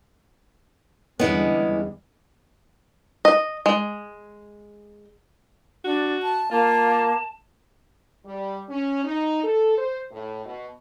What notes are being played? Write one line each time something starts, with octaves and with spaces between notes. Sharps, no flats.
E2 D3 G3 G#3 B3 C#4 E4
D#5
G#3
D4 F#4
A5
A#3 F4 A5
G3
C#4
D#4
A4
C5
A2
B2